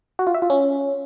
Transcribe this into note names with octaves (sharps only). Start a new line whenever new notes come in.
F#4
F4
E5
F4
C#4